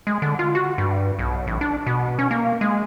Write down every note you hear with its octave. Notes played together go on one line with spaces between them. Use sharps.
G#3
D3
F4
F#4
G2
B1
A1
D4
B2
C#4
A#3
G#3